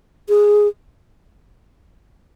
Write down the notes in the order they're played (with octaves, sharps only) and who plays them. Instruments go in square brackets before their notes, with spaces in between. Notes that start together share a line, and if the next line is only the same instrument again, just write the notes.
[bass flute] G#4